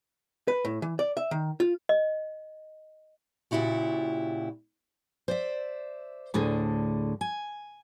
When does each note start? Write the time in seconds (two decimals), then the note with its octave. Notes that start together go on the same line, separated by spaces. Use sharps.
0.48 B4
0.65 A2
0.82 E3
0.99 D5
1.17 E5
1.31 D#3
1.60 F4
1.89 D#5
3.51 A#2 C#3 E4 F#4 G4
5.28 C5 D5 E5
6.34 D2 A2 D3 G#4
7.21 G#5